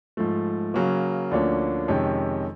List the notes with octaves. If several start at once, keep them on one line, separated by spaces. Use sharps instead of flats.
G#2 F3 A3
C#3 F#3 A#3
D2 D3 F3 A#3 C#4
F2 C3 D#3 G#3 C#4